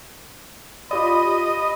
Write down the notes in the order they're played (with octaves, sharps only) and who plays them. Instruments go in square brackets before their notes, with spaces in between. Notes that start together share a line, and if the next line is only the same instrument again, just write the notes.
[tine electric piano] F4 G4 D5 [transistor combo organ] D#5 [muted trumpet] B5